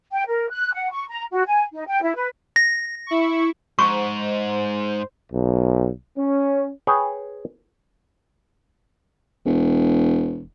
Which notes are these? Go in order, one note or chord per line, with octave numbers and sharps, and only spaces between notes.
G5
A#4
F#6
F#5
C#6
A#5
F#4
G#5
D#4
G5
E4
B4
A#6
E4 C#6
G#2 C5 C#6
B1
C#4
G#4 B4 C#5 G5
E1